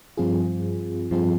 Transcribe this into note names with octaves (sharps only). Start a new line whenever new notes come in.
G2 F3 C4 F4 G#4
G2 F3 C4 F4 G#4